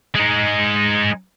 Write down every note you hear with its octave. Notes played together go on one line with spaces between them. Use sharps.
G#3 D#4